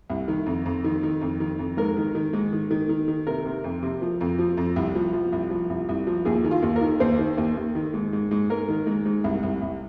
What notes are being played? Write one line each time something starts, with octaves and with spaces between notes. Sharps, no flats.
C2
D#3
F2
F2
D#3
D#3
F2
D#3
F2
G#2 A#4
D#3
D#3
G#2
D#3
D#3
D#3
D#3
C3 A#4
C3
F2
C3
F3
F2
F3
F2
C2
F3
F3
C2
F3
C2
C2
F3
D#2 G#4
D#3
F4
D#2
A#4
D#3
D#2 C5
D#3
D#2
D#2
D#3
G#2
G#2
G#2
G#2 A#4
D#3
G#2
G#2
C2
C2
C2